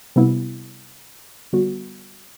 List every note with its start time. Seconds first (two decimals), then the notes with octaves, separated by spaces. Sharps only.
0.16 C3 G3 B3 E4
1.53 D3 G3 B3 F#4